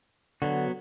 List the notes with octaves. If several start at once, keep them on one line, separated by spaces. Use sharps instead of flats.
D3 F#3 B3 F#4